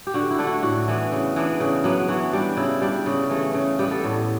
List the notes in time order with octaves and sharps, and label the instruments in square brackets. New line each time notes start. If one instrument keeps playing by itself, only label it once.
[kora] G4
D3 F#4
E4
A3 D4
F#4
A2 F#4
E3 B3 D4
C#3
E3 B3 D4
C#3
F#3 B3 D4
E3 F#4
G3 D4
C#3 E4
G3 D4
C#3
E3 A3
C#3
G3 B3 G4
A4
A2